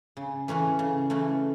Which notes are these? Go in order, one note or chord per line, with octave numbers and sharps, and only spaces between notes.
C#3
E3 A3 C#4 F#4
C#3
E3 A3 C#4 F#4